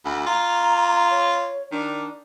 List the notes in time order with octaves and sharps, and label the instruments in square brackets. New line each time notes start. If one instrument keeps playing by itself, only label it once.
[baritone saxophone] D2 [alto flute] B5
[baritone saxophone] F4 [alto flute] A#5
[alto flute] C#5
[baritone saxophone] D#3 [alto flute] D4